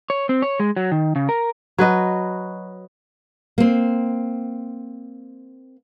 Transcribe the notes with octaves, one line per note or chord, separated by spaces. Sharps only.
C#5
C4
C#5
G#3
F#3
D#3
C#3
A#4
F#3 B4 D#5
A#3 C4